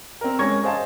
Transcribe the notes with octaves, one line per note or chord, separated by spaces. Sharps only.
C4 A#4
G#3 C#4 C#6 G#6 A#6
G#4 C5 D#5 F5 A5